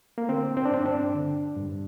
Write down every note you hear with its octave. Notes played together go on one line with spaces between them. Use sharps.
A#3
D3 C4
C4
D4
G2 C4
D4
D3
G2